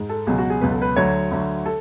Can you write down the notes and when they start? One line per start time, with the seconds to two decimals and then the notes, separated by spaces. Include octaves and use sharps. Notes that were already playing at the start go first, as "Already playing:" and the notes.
Already playing: G#2
0.09 A4
0.27 C#2 B2 F#3 G#4
0.38 F#4
0.50 G#4
0.61 C#2 B2 F#3 B4
0.71 A4
0.82 B4
0.96 D2 D3 F#3 C#5
1.31 D2 D3 F#3
1.66 A4